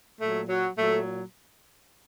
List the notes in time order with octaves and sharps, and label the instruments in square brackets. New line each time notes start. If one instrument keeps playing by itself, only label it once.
[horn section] A#2 F#3 A3
F#3
A#2 F#3 A3